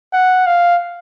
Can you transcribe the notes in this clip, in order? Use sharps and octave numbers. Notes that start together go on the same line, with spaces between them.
F#5
F5